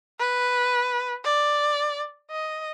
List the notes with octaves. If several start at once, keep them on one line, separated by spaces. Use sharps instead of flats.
B4
D5
D#5